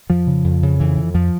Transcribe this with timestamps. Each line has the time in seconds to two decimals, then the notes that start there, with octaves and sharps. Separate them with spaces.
0.09 F2 F3
0.27 C#3
0.44 F2
0.63 C#3
0.80 F2 E3
0.97 F2
1.14 F2 F3